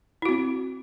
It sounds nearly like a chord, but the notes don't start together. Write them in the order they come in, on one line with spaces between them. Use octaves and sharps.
E4 F#4 C4